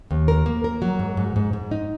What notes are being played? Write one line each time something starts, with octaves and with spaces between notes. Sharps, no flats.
D#2
A#4
A#3
A#4
F#3
G#2
G#2
G#2
G#2
D#4